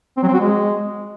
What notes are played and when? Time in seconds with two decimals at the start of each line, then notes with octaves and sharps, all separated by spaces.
0.17 C4
0.23 F#3
0.28 C4
0.34 F#4
0.39 G#3